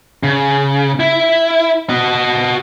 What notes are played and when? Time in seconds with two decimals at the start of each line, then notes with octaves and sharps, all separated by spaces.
0.23 C#3
1.00 E4
1.90 F#4 D#5